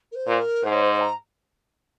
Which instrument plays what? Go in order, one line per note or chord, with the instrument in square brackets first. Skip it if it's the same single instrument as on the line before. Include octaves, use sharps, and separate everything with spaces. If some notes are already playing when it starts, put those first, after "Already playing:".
[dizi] A#4
C5
[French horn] A#2
[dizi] A#4
[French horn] G#2 [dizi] C5
[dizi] C#5
C5
A#5